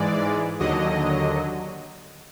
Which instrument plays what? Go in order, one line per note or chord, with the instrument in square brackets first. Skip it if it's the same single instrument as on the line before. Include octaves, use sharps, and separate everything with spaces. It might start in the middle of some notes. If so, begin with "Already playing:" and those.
Already playing: [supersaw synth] G#2 E3 G#3 D5
D#2 D3 F#3 D#5